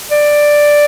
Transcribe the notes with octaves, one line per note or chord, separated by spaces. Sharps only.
D5